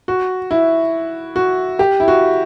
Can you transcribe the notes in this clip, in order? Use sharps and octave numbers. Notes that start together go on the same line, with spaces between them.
F#4
E4
F#4
G4
E4
F#4